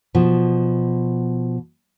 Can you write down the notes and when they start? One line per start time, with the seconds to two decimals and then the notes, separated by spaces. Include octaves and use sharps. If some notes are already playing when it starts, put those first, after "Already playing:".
0.15 B2 F3